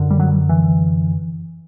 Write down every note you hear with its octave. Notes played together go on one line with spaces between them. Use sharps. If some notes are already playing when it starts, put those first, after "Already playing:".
Already playing: F#2 D3
G3
F#3
E3